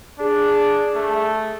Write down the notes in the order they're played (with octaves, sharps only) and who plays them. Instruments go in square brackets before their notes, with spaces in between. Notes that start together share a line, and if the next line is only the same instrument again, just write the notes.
[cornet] D4 [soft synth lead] G#4
[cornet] A3